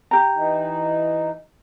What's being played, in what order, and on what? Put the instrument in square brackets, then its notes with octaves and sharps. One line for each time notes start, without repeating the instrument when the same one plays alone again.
[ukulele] G4 A#5
[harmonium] E3 D#4